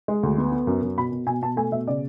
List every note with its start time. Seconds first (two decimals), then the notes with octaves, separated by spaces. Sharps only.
0.08 G#3
0.23 D2
0.38 B3
0.52 B3
0.67 F#2
0.82 F#2
0.97 B2 B5
1.12 B2
1.27 B2 G#5
1.42 B2 A5
1.57 A3 G#5
1.72 B2 E5
1.87 C#3 D5